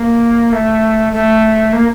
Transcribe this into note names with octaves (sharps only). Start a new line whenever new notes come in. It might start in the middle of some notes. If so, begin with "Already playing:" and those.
Already playing: A#3
A3
A3
A#3